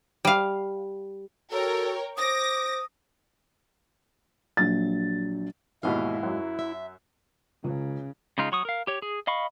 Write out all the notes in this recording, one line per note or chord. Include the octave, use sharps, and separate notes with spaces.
G3 F5
F#4 A4 A#4 C#5 G5
C5 D6 D#6 A#6
A#1 F#3 A6
D#2 G#2 B2 E3 E4 D#5 F5
F#2 F#3
E5
C#2 C#3
C#3 G#3 D#4 F4
F#3 C#6 D#6
A#4 F5
G4 C#5
G#4
D#5 F5 B5 C#6